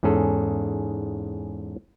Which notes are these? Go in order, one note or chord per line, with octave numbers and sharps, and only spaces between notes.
E2 G#2 C#4 G#4 A4